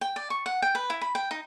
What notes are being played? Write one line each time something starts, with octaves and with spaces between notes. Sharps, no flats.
G5
D5
C#6
F#5
G5
B4
E4
B5
G5
D#4